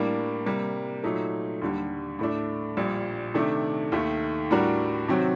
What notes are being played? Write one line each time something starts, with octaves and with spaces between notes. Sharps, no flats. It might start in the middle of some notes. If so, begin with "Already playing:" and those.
Already playing: A2 G3 A#3 D4
C3 G3 A#3
A#2 F#3 A3 D#4
D#2 D3 G3
A2 A3 D4
A#1 A#2 G3
C3 D#3 A3 D4
D#2 D#3 A3
A2 G3 D4 F#4 A#4
C3 D#3 F#3 C4 F#4